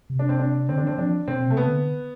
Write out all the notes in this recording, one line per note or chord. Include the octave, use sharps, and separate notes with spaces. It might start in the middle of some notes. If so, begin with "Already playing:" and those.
C3
D4
C4
D4
D3 C4
D4
E3 C4
F3 D4
B2 C4
C3 A3
B3
D3